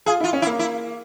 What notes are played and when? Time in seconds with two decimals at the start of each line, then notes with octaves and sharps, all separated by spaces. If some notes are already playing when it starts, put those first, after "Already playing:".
0.06 F4 G#4
0.20 E4 F4
0.33 C#4
0.42 E4
0.46 A#3
0.59 E4